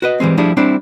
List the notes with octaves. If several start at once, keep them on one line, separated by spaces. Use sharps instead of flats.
F#4 B4 D#5
E3 G3 G#3 C4
F3 G3 A3 D4 E4 G#4
G3 C4 D4 E4